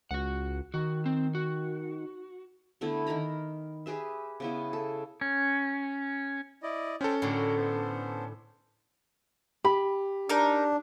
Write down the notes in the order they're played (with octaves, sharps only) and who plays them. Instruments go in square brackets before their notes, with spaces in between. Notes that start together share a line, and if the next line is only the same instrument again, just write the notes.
[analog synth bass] C#2 [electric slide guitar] F#4 F#5
[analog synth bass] D#3 [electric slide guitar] F#4
[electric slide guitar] C4
F#4
[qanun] D3 A3 B3 E4
D#3 A#4 A#5 B5
G4 G#4 B4 E5
C#3 B3 E4
A4
[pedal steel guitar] C#4
[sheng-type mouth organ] E4 D5 D#5
[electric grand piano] C#4 A4 [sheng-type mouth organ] C5 G5
[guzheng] A2 D3 [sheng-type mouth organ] F#4 A#4
[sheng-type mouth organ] B3 C5
[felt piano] G4 [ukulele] B5
[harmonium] D4 [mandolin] D#4 A#4